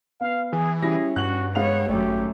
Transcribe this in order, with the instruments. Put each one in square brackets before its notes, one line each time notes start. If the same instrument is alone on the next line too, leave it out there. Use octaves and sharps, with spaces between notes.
[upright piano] B3 [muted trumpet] F5
[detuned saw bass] E3 [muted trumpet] G#4
[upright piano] G3 E4 A#6 [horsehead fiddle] C#4 [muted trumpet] G#4
[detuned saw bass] G2 [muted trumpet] F#4 [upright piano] F#6 F#7
[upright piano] G#3 F5 F7 [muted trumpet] B3 [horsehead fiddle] C#5 F#5
[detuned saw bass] G#1 [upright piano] F#2 C#5 [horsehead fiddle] A3 C#4 [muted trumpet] G4